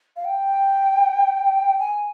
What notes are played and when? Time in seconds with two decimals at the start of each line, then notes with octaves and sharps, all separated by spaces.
0.16 F5
0.25 G5
1.79 G#5